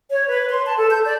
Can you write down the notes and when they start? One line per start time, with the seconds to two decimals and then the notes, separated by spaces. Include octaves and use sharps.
0.10 C#5
0.28 B4
0.49 C6
0.65 A5
0.78 A4
0.90 G6
1.06 D5